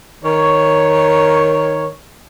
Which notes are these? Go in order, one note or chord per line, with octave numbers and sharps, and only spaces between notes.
D#3 A#4 C#5